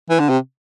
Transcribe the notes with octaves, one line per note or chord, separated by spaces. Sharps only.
E3
D3
C3